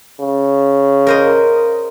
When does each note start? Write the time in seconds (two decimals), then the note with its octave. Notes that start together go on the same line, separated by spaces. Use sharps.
0.20 C#3
1.07 A#4 C5 D#5